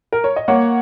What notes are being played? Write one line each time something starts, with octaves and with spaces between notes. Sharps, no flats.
A#4
C#5
D#5
A#3 C#5 F#5